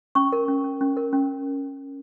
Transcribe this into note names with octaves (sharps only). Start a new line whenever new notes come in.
C#4 C#6
A#4
C#4
C#4
C#4
A#4
C#4